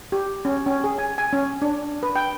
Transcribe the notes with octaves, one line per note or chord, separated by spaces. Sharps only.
G4
C#4
C#4
G#4
G#5
G#5
C#4
D4
B4
G5